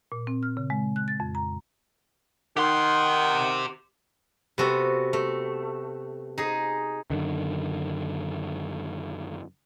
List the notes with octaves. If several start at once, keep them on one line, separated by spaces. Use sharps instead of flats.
A#2
C4
F6
C#3
G#3
F#6
A6
F2
A#5
D#3 G4 F#5 C6
C3 B3 F#4 A4
A3
D#4 G#4
F#2 D3 D#3